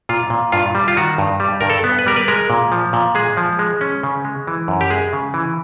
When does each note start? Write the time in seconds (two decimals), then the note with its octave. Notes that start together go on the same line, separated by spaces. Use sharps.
0.09 A#2 F4
0.30 A#2
0.52 G2 F4
0.75 G3
0.88 F4
0.97 D#3 F#4
1.18 G2
1.40 G3
1.61 G2 A#4
1.70 A4
1.84 B3
1.99 B4
2.06 G3 A#4
2.16 B4
2.28 G#3 A#4
2.50 A#2
2.72 F3
2.93 A#2
3.15 G#3 G#4
3.37 F3
3.59 G#3
3.81 C#4
4.03 C#3
4.25 G#3
4.47 E3
4.68 F#2
4.81 G4
4.90 G#3 G#4
5.13 C#3
5.34 E3